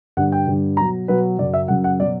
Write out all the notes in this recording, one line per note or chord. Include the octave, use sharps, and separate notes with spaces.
G2 D3 G3 F#5
G5
G2 D3 G3
B2 F#3 A#5
B2 F#3 B4
F#2 C#3 F#3 D5
E5
F#2 C#3 F#3 F#5
F#5
B2 F#3 D5